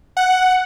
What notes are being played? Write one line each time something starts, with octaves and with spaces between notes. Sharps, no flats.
F#5